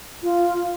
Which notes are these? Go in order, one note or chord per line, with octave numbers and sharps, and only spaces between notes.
F4